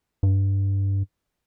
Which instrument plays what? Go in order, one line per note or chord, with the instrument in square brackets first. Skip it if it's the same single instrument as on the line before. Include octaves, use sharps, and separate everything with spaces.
[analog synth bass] G2